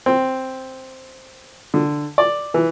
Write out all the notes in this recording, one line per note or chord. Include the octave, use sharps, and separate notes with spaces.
C4
D3
D5
E3